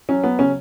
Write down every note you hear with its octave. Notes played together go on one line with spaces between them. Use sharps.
F#3 C#4
F#3 B3
C#3 C#4